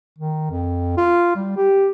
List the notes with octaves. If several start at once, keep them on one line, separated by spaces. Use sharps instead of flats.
D#3
F2
F4
G3
G4